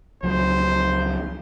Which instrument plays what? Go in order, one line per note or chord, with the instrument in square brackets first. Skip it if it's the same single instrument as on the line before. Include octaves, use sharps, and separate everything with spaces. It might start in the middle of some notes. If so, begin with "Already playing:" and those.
[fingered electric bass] C#2 F3 F#3 [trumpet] C5